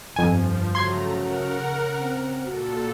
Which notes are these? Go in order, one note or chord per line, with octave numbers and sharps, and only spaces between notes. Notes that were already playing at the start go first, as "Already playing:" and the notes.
G1 F2 F3 G#5
C#3 F#3 A3 A#5 C6 G#6
A#4 F#5
C4
A#2 F#4 A4